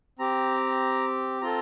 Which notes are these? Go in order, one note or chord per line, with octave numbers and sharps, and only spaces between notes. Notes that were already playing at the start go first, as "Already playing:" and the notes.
C4 G4 A#5
C4 F4 A4 A#5